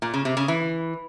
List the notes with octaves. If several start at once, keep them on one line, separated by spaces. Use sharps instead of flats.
A#2
C#3
C3
C#3
E3